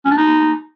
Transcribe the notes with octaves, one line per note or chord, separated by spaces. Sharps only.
C#4
D4
D#4